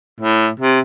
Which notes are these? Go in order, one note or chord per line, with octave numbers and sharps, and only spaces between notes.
A2
C3